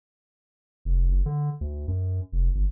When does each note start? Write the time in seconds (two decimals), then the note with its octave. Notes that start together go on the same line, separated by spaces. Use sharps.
0.85 F1
1.08 F#1
1.26 D3
1.61 D2
1.88 F#2
2.32 F1
2.55 G1